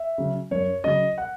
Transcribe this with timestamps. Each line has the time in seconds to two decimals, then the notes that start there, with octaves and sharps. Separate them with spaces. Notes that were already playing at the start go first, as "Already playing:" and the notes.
Already playing: E5
0.18 C#3 F#3
0.51 F#2 C#5
0.84 C#3 F#3 D#5
1.18 F#5